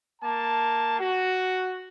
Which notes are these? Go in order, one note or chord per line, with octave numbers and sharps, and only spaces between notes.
A#3 A5
F#4